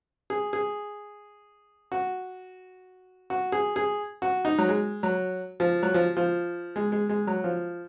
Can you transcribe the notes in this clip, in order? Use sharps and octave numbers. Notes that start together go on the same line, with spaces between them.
G#4
G#4
F#4
F#4
G#4
G#4
F#4
D#4
F#3
G#3
F#3
F3
F#3
F3
F3
G#3
G#3
G#3
F#3
F3